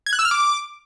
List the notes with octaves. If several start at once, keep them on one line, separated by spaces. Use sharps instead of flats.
G#6
F#6
E6
F6
D6